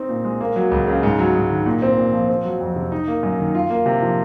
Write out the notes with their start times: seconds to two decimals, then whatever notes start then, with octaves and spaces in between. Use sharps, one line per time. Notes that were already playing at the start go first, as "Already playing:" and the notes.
Already playing: C4 D#4
0.09 A#2
0.25 G#3
0.41 A#3
0.56 F#3
0.71 C#2
0.87 C#3
1.03 G#2
1.19 F#3
1.35 G#2
1.51 D#3
1.66 A#2
1.82 C4
1.98 A#2
2.13 F3
2.29 C4
2.45 F#3
2.61 F2
2.76 C3
2.92 D#4
3.08 A#3
3.23 F#2
3.39 D#3
3.55 F4
3.70 A#3
3.86 C3
4.02 F3